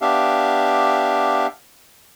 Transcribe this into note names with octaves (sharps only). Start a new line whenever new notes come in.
B3 D4 G4 E5 F5